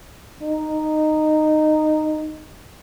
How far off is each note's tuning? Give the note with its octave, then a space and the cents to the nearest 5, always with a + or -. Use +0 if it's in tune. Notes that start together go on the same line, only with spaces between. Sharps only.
D#4 -10